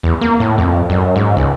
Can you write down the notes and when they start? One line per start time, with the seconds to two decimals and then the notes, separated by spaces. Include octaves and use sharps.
0.03 E2
0.21 A#3
0.40 A2
0.58 F2
0.90 F#2
1.16 G#2
1.37 C#2